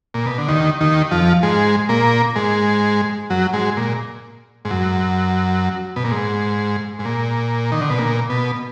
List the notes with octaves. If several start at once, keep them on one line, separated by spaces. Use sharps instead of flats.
A#2
B2
D3
D#2 D#3
D#2 D#3
F2 F3
G#2 G#3
A#2 A#3
G#2 G#3
F#2 F#3
G#2 G#3
A#2
G#2
F#2
B2
A#2
G#2
G#2
A#2
D#3
D3
B2
A#2
B2